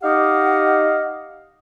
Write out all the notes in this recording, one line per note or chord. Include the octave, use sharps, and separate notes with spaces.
D#4 G4 D#5 F5 F#5